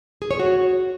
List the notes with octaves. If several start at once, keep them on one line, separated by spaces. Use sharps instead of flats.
G#4
C#5
F#4